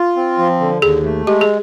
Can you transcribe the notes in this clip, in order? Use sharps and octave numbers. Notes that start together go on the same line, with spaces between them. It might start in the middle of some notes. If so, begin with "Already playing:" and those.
Already playing: F4
C4
F3
D3
D#2 G#4
A3
G#3 G4
G#4